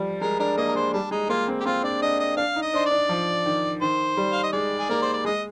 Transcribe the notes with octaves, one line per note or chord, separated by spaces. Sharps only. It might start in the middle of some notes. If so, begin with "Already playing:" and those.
Already playing: F3 G3
G#3 A#4
D4 A#4
A#3 D#5
A#4
G#3 C5
G3 D4
G#3 D#4
A#3 F4
C4
G4
C4 F4
D4 D5
D4 D#5
D#5
D4 F5
D#4
D#5
D4 C5
D5
D4
F3
D#3
D#3 C5
G3
F5
D#5
G#3 D5
G#4
A#3 A#4
C5
D5
G#3 D#5